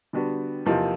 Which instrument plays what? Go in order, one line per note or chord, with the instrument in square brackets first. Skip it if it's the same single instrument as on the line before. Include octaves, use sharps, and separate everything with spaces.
[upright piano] D3 G3 B3 D4 F#4
E2 C3 F3 A#3 D#4